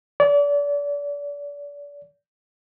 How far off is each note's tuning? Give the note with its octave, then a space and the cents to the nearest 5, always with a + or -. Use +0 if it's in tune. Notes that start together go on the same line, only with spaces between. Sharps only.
D5 -35